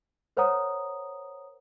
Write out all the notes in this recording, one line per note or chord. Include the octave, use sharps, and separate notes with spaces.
A#4 C5 C#5 F#5 A#5 D#6